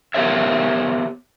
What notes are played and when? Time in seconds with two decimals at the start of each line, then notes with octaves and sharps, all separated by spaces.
0.14 B3 G4 A#4 C5 C#5 E5